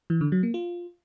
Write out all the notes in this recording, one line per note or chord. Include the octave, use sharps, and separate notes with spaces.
E3
D3
F#3
A#3
F4